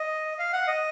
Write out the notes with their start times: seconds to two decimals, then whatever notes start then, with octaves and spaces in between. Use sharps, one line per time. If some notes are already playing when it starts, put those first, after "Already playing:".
Already playing: D#5
0.39 F5
0.53 F#5
0.68 D#5